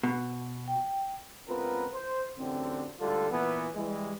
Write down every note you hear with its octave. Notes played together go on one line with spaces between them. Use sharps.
B2
G5
C#2 B3 C4 F4 A#4 B4
C5
A1 F#2 D3 C4
D2 G#2 D3 G3 F4 A4
A#2 E3 B3
E3 G3 G#3